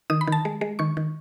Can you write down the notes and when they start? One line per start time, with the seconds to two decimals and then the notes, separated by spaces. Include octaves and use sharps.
0.10 D#3 D#6
0.21 B5
0.27 D#3 A5
0.45 G#3
0.61 G#3
0.79 D#3 C#6
0.97 D#3